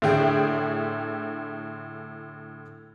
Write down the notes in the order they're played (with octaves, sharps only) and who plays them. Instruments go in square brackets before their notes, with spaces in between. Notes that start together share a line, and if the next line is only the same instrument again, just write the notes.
[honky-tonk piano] A2 D3 G#4 G5